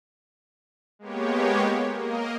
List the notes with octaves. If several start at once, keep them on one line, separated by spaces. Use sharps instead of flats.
G#3 A#3 B3 G4 C#5
A#3 A#4 D#5